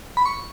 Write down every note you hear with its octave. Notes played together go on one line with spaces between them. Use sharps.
B5
C#6